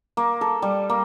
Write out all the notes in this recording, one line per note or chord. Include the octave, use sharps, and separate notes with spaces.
A#3
A4
G3
A#3